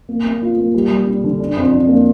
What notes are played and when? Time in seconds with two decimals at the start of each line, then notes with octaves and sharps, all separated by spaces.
0.09 A#3
0.24 A#3
0.42 F4
0.57 A#3
0.74 G3
0.91 G3
1.06 D4
1.24 D3
1.40 D4
1.57 F2
1.72 D4
1.89 A#3